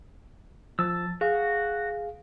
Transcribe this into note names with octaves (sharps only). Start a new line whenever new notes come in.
F3 A5 E6
F#4 G#4 F5